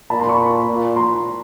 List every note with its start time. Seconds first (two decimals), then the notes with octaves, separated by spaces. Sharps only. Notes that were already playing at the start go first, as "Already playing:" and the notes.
0.10 A#2 A5 B5
0.20 A#5 C6
0.29 B5 C#6
0.68 A#2
0.96 A#5 C6